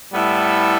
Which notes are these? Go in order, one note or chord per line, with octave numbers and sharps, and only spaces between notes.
A2 G3 B3 E4 A4